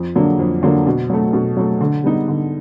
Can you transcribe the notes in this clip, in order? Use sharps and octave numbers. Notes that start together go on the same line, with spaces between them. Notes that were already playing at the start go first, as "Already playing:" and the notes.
Already playing: F2
D3 F#3 A#3 D4
F2
D3 F#3 A#3 D4
B2
F#3 A3
B2
F#3 A3
D3
G3 B3 D#4
D3